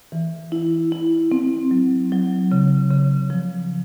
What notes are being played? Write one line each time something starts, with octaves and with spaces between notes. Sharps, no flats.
E3
E4
E4
C4
F#3
F#3
C#3
C#3
F3